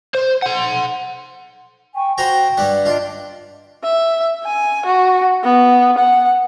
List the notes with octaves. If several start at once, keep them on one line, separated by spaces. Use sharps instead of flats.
C5
F#5 C6
G5 G#5 C#6
F#4 C5 G5 A#5
G2 G3 F#5
D4 F4 D#5 A5
E5
G#5
F#4
B3
F#5